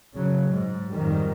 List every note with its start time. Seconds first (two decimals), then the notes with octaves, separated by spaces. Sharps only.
0.14 C#3 F#3
0.48 G#2
0.92 F2 G#2 D#3 G3